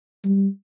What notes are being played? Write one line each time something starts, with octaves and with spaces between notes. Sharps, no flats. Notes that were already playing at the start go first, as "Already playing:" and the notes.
G3